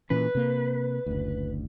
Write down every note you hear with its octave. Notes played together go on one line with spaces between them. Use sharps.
A#2 E3 C#4 B4
C3 A#3
F#1 D2